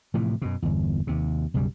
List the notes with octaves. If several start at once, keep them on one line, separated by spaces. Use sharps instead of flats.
A2 C3 E3 F3
F#2 B2
G1 E2
D#2 C3
B1 F#2 C#3 G3